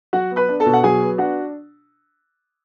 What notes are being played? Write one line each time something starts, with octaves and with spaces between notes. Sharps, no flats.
F#3 F#4 F#5
B3
B4 B5
D4
A4 A5
B2
F#5
F#3 G#4 G#5
B3
D4 F#4 F#5